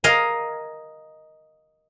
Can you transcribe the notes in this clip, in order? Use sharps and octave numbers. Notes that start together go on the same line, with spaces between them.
A#4 D#5 F5 G#5